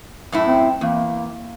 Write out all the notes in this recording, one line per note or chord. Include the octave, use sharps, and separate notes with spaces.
F#2 A2 E4
C4
E2 A#3